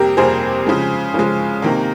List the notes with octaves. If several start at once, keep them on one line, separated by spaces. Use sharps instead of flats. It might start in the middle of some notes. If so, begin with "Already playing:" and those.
Already playing: F2 C3 G3 A#3 G4 A#4
F2 C3 G3 A#3 G#4 C5
C#3 F3 G#3
C#3 F3 G#3
C3 D#3 A#3